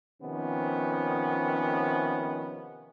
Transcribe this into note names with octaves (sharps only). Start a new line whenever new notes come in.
C3 D#3 F3 B3 C#4